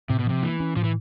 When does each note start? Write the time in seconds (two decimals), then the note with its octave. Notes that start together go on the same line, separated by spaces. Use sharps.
0.10 A2 C3
0.19 B2
0.26 C3 F3
0.43 E3 A#3
0.60 C#4
0.76 A2 F3
0.84 E3